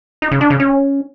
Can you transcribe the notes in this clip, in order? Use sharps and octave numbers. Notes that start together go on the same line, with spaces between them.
D#4
C#3
D4
C#3
C#4